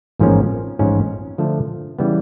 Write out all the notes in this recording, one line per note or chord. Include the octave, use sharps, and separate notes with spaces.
A1 G#2 F3 A#3 C#4
A1 G#2 F3 G#3 C#4
D3 F3 A3 D4
C#3 E3 G3 B3